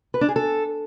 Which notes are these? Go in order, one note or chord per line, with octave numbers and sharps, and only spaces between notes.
B4
D4
G#4
A4